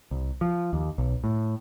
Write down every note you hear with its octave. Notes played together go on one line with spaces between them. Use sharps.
C2
F3
D#2
B1
A2